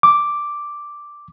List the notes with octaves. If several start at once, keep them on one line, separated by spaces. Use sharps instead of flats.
D6